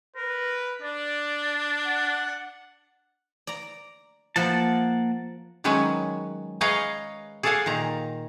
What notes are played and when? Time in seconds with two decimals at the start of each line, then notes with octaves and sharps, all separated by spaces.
0.16 A#4 B4
0.82 D4 D5
1.86 F#5
3.47 D5 A#5
4.36 F3 A#3 C5 F#5 A5 B5
5.64 D#3 F#3 G#3 C#4 B4 G#5
6.61 G#4 B4 C#5 D#5 F5 A#5
7.43 G#4 A4 D5 F5 F#5 G#5
7.66 A#2 D#3 A#5